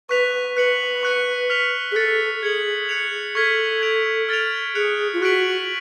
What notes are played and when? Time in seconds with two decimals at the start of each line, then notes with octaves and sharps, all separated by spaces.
0.09 B4 C#6 F#6 B6 F7
0.57 B4 F#6 C#7 F#7
1.03 C#6 F#6 C#7
1.50 F6 B6 F7
1.92 G#4
1.96 A4 F#6 A6 C#7
2.42 G#4 G#6 C#7 F#7
2.89 F#6 C#7 F7
3.35 A4 C#6 F6 G#6 B6 F#7
3.82 G#6 D7 F7
4.29 F6 A6 D7 F7
4.75 G#4 F#6 C#7 F7
5.13 F4
5.21 F#4 C#6 F#6 B6 D7 F#7